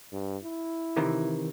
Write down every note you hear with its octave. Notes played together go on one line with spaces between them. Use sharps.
G2
E4
C3 D#3 E3